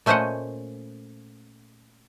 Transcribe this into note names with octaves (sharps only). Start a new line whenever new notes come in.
A#2 A3 C#4 C5 D#5 F#5